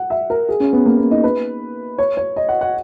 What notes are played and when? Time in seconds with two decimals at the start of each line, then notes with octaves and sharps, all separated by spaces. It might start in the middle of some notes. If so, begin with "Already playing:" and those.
Already playing: F#5
0.10 E5
0.30 A#4
0.49 G#4
0.60 C#4
0.73 B3
0.86 A#3
0.98 B3
1.11 D#4
1.24 B4
1.98 C#5
2.17 C#5
2.36 D#5
2.49 F#5
2.61 F#5